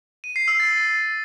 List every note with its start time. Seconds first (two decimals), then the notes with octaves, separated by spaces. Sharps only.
0.24 D#7
0.36 C7
0.48 E6
0.60 A6